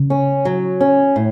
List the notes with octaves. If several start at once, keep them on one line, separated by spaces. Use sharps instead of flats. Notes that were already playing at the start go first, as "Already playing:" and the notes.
Already playing: C#3
C#4
F#3
C#4
A2